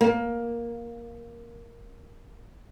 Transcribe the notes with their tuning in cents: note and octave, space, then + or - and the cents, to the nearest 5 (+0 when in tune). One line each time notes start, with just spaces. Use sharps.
A#3 +10